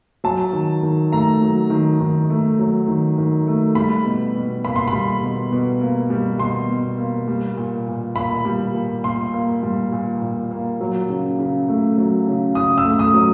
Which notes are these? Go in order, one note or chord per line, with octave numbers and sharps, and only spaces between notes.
F#3 A5
D#3
D#3
A3 A#5
F#3
D#3
D#3
A3
F#3
D#3
D#3
A3
G3 B5
B2
B2
A#3 B5
C6
B5
G3
B2
B2
A#3
G3
B2 C6
B2
A#3
G3
A#2
A#2
A#3 B5
G3
A#2
A#2 C6
A#3
G3
A#2
A#2
A#3
F#3
C#3
C#3
A3
F#3
C#3
C#3 D#6
E6
A3
D#6
F#3